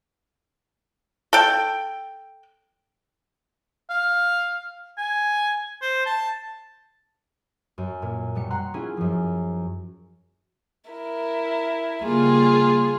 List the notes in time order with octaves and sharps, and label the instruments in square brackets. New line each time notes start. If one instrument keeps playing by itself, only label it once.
[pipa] A4 G5
[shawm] F5
G#5
C5
A5
[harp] F#2
A#2
B2 G3 C#7
F#5 A#5 C6
C#4 E4 F4 G#4
F#2 F3
[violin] E4 A#4
[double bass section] C#3 G3 A#3 [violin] F4 G#4